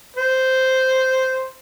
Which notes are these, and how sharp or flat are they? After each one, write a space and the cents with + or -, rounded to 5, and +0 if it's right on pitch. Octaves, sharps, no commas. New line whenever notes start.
C5 -5